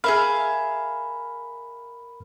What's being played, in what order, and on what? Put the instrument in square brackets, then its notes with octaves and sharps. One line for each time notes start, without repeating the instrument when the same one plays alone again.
[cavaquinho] G#4 E5 F5 [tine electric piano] A#4 B5 F6